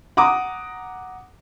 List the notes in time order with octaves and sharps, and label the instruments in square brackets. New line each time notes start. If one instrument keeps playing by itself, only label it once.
[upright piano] F#5 A#5 D6 D#6